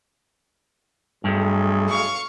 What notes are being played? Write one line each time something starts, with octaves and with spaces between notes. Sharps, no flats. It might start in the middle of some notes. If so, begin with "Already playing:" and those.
B1 G2 A3 G#4
F5 C#6